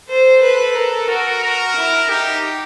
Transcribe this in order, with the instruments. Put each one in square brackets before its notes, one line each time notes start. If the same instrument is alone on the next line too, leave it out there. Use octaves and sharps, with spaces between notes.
[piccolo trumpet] A4 [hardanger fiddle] C5
[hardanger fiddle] B4
A#4
[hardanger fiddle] F#4 [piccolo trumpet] A#4
[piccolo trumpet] A#4
[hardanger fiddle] E4
[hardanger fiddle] D#4 [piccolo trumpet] G4